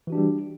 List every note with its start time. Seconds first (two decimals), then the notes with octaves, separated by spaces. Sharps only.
0.07 E3
0.10 F#4
0.12 D4
0.15 G4
0.18 G3